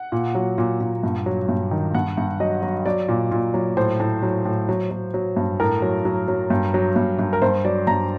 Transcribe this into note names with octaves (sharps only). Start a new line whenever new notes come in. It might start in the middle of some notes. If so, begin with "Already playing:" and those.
Already playing: F#5
A#2
F#3
A#2
A#2
G2
F#3
G2
D#3
G2 F#5
G2
F#3 D#5
F#3
F#3 D5
A#2
A#2
F#3
A2 C5
A2
F#3
A2
F#3
F#3
F#3
G2
A2 A#4
F#3
F#3
F#3
G2
F#3
G2
G2
A#4
G2 C5
F#3 D5
G2 A#5